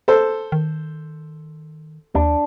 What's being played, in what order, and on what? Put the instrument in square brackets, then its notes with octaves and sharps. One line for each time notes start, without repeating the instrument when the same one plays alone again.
[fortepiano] A4 C5
[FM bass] D#3
[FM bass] D#2 [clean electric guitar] D4